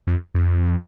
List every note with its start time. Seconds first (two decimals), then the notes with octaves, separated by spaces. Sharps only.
0.07 F2
0.34 F2